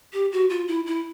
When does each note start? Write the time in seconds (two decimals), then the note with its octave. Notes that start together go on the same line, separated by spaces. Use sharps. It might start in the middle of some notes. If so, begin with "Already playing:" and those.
0.13 G4
0.32 F#4
0.50 F4
0.68 E4
0.86 E4